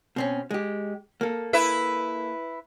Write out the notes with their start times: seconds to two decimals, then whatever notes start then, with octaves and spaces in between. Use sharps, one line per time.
0.16 B2 C4 C#4
0.51 G#3 G4
1.21 A#3 A4
1.53 E4 B4 E5